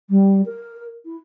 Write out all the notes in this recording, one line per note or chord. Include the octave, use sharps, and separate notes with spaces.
G3
A#4
E4